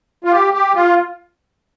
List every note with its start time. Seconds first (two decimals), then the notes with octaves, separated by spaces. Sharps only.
0.24 F4
0.32 G4
0.54 G4
0.75 F4